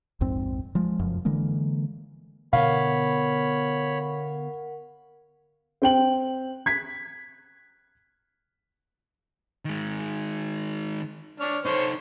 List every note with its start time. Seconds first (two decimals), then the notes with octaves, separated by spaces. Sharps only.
0.21 A#1 F2 G#2 C4
0.75 F3 G#3
0.99 F1 F#2 F3
1.25 D3 E3 G#3 A#3
2.53 B2 D3 B3 A#4 C#5 F5 F#5 B5
5.82 C4 G5 F#7
6.66 G#6 B6
9.65 D#3 G#3
11.40 D4 C#5 F6
11.65 D#4 A4 C5 C#5